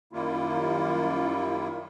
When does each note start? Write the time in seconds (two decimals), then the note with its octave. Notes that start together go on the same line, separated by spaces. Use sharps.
0.13 F#2 D#3 G3 A#3 E4 F4